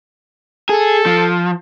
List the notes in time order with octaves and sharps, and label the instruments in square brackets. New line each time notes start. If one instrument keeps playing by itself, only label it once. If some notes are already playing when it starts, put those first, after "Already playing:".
[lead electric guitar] G#4 [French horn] A4
[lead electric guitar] F3